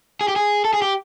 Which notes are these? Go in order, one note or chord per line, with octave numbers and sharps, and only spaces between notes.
G#4
G4
G#4
A4
G#4
G4